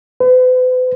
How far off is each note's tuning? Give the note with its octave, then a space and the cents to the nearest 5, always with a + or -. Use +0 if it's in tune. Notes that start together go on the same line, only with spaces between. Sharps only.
B4 +45